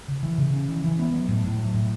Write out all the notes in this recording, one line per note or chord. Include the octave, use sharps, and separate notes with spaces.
C#3
E3
C#3
C#4
E3
E3
B3
F#3
A2
A2
F#3
A2